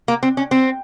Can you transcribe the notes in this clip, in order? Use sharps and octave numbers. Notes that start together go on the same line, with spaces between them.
A#3
C4
C#4
C4